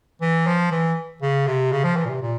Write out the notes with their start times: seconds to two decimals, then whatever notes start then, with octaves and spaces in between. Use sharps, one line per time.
0.21 E3
0.47 F3
0.71 E3
1.22 C#3
1.47 C3
1.72 C#3
1.84 F3
1.96 E3
2.05 A#2
2.09 C3
2.22 A#2